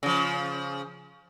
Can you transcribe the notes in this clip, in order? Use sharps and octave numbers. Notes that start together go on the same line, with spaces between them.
C#3 F3